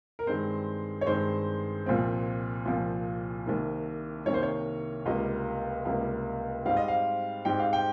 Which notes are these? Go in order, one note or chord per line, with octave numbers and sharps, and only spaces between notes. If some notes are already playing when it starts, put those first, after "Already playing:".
A#4
G2 D#3 G#3 C4 C5
C#5
G2 D#3 G#3 C4 C5
C2 A#2 F3 C4
C2 A#2 F3 C4
C2 C3 D#3 A#3
C2 C3 D#3 A#3 C#5
C5
C#5
C#2 C3 G3 A#3 D#5
C#2 C3 G3 A#3
G#2 G3 C4 F5
D#5
F5
G#2 G3 C4 G5
F5
G5